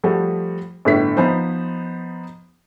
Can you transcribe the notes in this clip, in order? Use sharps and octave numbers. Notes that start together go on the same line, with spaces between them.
F3 G3 A3 F#4
G1 A2 D3 B6
F3 B3 D#4 C5